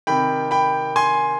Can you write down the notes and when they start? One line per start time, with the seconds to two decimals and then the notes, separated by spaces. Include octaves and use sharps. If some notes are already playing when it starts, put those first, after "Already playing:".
0.07 C3 D#3 G5 B5
0.51 G5 B5
0.96 G#5 C6